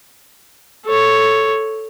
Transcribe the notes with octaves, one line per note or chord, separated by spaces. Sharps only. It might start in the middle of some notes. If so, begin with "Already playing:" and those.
A4 C#5